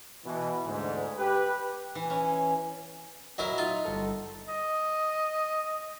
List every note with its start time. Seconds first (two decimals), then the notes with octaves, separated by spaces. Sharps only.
0.24 B2 E3
0.65 D2 G#2
1.17 G4 B4
1.95 E3
2.10 C#4
3.38 F#3 E4 A#4 D#5 E5
3.58 D#4 F4
3.85 G1 A4
4.49 D#5